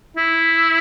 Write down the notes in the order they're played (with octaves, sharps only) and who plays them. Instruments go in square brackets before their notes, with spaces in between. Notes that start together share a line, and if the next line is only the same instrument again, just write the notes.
[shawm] E4